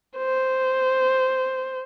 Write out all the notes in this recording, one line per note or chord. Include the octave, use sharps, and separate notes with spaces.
C5